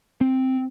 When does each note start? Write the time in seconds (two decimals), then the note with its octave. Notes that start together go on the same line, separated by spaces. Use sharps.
0.21 C4